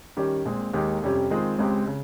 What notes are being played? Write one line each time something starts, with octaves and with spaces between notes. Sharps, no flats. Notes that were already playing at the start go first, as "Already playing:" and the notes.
D#3 G3 C#4 G4
A#2 G#3 C4
D#2 D#3 G#3 D#4 G4
F2 C3 G3 C#4 G4
D#3 G#3 C4 F4 G#4
C#2 C#3 G#3 C4 G4
C#3